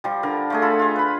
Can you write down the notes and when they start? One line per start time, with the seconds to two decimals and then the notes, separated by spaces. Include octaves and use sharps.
0.04 F3 G3
0.23 D3 A#4
0.50 F3 A3 G#4
0.62 F4 A4 B5
0.79 F4 G#4
0.96 B4 B5